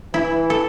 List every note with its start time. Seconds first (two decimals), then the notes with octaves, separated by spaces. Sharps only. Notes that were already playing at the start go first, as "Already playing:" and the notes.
0.14 E3 E4
0.50 A4